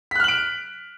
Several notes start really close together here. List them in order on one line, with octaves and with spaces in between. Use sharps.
B6 F#6 F6 F#7 D7